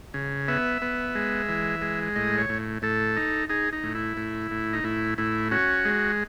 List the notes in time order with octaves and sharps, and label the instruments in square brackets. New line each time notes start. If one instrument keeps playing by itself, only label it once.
[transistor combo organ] C#3
B3 E5
B3
G#3
E3
G#3
A2 D#5
C#5
A2
A2 A4
D#4
D#4 G#4
D#4
A2
E4
A2
A2
D#4
A2 E4
A2 E4
C#4 F#4
G#3